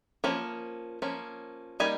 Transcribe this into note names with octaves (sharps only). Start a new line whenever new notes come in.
F3 A#3 C#4
F3 A#3 C#4
G3 A#3 D#4 G#5